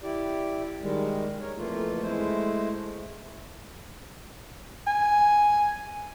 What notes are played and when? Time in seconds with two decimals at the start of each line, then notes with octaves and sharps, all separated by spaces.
0.01 E4 G4 D5
0.81 D#3 G3 G#3
1.41 A#4 C#5
1.57 F2 E3 A3 A#3 F4
2.02 G#3 A3 E4 C5
4.87 G#5